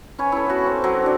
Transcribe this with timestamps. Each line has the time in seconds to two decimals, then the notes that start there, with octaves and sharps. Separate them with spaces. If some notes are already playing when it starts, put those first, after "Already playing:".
0.19 C#4 B4 C#5 G#5
0.32 E4 A4
0.46 B3 F#4
0.64 C4 C#4
0.84 F#3
1.02 D4 D5